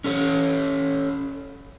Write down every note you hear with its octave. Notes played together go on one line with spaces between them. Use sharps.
C#4 A4 C#5